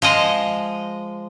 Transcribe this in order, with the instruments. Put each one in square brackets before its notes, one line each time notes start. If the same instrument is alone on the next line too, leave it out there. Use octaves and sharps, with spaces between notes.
[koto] F3 G#3 D#5